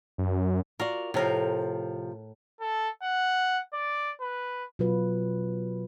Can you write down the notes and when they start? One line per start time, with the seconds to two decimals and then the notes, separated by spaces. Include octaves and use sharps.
0.18 F#2
0.80 F4 F#4 A#4 D5
1.14 A2 C3 F3 A#4
2.61 A4
3.03 F#5
3.74 D5
4.21 B4
4.79 B2 F#3 F4 B4